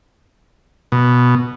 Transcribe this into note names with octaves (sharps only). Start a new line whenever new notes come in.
B2